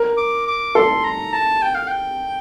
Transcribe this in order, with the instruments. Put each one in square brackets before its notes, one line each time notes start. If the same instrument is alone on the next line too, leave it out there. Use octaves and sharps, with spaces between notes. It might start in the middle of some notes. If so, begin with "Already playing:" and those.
Already playing: [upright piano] A#4
[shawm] D6
D6
[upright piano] A4 [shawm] C6
[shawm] A#5
A5
G5
F5
G5